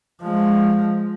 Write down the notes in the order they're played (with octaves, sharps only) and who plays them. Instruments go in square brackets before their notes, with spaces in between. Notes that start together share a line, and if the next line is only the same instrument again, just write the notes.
[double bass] F3 G#3